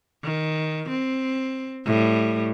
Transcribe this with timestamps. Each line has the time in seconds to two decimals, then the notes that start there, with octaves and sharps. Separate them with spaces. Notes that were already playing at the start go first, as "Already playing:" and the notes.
0.24 D#3
0.90 C4
1.86 A2 G3